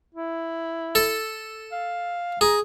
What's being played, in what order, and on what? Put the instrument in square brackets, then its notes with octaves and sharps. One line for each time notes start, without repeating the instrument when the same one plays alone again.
[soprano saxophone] E4
[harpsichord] A4
[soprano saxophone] F5
[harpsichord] G#4 [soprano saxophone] A#5